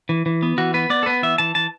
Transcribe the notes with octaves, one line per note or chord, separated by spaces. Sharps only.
E3
E3
B3
E3 F#4
B3 B4
B3 D5
A4
B3 B4
E3 E5
E3 A5
E3 A5